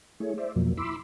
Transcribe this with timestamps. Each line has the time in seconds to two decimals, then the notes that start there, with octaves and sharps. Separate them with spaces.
0.20 A3 E4 G#4 C#5
0.38 C5 D5 E5
0.55 F2 B2 F3 F#3 A#3
0.77 E4 B5 C6 D6 E6